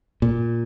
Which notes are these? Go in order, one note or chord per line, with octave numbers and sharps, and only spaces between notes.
A#2